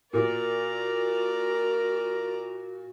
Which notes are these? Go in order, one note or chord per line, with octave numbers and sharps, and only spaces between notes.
A#2 F#4 A#4 D5 A#5